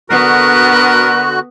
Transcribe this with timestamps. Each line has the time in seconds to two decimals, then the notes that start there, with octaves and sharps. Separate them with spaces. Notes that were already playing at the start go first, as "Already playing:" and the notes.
0.10 D3 B3 F#4 A#4 F#6